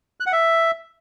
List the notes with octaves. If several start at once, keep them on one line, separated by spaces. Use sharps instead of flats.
F#6
F#5
E5